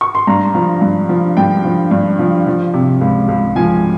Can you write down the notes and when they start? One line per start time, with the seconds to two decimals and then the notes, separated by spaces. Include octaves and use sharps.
0.01 C#6
0.15 C6
0.27 G2 A#5
0.55 F3
0.81 G2
1.09 F3
1.37 G2 G5
1.65 F3
1.91 G2
2.19 F3
2.46 F3
2.74 C3
3.01 C#2
3.28 C#2
3.56 F3 G#5